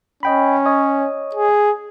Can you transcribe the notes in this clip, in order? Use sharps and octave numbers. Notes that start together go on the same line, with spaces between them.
C#4 D#5 G5 B5
C#5 D#5 D#6
G#4